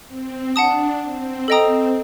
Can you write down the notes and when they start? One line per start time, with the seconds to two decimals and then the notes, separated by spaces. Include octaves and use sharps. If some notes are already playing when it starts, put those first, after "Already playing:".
0.08 C4
0.55 D4 F#5 A5 D#6
1.02 C4
1.48 C4 A4 D#5 G5 A#5 D#6